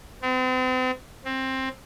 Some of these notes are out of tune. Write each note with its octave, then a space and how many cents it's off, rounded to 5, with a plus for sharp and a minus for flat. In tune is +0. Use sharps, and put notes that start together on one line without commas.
C4 -40
C4 +15